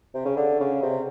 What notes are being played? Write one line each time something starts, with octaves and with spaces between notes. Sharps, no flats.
C3
C#3
D3
C#3
C3